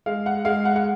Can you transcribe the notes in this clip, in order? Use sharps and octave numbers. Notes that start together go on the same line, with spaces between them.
G#3 F5
F#5
G#3 F5
F#5
F#5